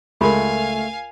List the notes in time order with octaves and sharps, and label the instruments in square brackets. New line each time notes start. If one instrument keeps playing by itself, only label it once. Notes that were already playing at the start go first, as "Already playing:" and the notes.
[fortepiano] C#2 G#3 [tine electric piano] A3 [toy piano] F4 A#4 [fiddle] F5 G#5